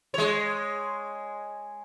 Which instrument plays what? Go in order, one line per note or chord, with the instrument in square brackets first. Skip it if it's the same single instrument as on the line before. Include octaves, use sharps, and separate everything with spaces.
[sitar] G#3 C#5